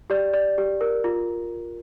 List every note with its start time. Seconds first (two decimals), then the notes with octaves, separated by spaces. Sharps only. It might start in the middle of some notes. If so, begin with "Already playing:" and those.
0.10 G4 D5
0.33 D5
0.58 G4
0.81 A#4
1.04 F4